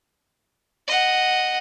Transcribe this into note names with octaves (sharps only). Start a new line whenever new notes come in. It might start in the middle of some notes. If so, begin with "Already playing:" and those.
D#5 F#5